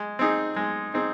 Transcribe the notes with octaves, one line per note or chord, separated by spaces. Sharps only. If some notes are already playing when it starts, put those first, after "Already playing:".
Already playing: G#3
C4 D#4 G#4
G#3
C4 D#4 G#4